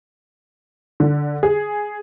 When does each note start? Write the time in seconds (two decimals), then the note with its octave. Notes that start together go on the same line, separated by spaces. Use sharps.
1.00 D3
1.43 G#4